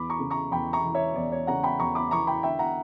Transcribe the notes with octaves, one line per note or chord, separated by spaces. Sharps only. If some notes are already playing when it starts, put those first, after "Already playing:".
Already playing: E2 B5 D6
A#5 C#6
C#3
A#5 C#6
E2 G5 B5
A#5 C#6
E3
C#5 E5
E2 D5
C#5
C#3 F#5 A#5
G5 B5
E2 A#5 C#6
B5 D6
E3 A#5 C#6
G5 B5
D3 E5 G5
F#5 A#5